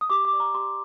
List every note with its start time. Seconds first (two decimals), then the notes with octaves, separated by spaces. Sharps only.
0.01 D#6
0.10 G4 D6
0.25 D6
0.33 D5
0.40 A#5
0.54 G4 C6